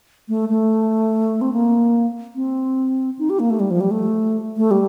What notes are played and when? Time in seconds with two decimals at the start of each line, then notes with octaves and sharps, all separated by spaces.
0.29 A3
0.49 A3
1.41 C4
1.53 A#3
2.36 C4
3.19 D#4
3.30 G4
3.40 A#3
3.50 A3
3.60 G3
3.71 F3
3.81 G3
3.91 A3
4.57 A3
4.71 G3